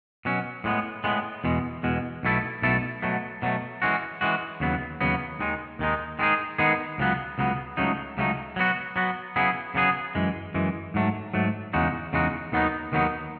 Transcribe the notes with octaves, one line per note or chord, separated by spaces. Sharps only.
B2 F#3 C#4
A2 G#3 B3
A2 G#3 B3
E2 B2 G#3
E2 B2 G#3
B1 B2 A3 E4 A4
B1 B2 A3 E4 A4
B2 F#3 A3
B2 F#3 A3
E3 G#3 C#4 F#4
E3 G#3 C#4 F#4
D#2 C#3 F#3 B3
D#2 C#3 F#3 B3
D#2 D#3 G#3 D#4
D#2 D#3 G#3 D#4
D#3 G#3 B3 D#4 G#4
D#3 G#3 B3 D#4 G#4
C#2 C#3 F#3 B3
C#2 C#3 F#3 B3
C#2 C#3 F#3 A3 D#4
C#2 C#3 F#3 A3 D#4
F#3 B3 F#4
F#3 B3 F#4
C#3 F#3 B3 E4 G#4
C#3 F#3 B3 E4 G#4
F#2 E3 G#3
F#2 E3 G#3
G#2 F#3 A3
G#2 F#3 A3
E2 C#3 G#3 D#4 F#4
E2 C#3 G#3 D#4 F#4
D#2 D#3 F#3 B3 D#4
D#2 D#3 F#3 B3 D#4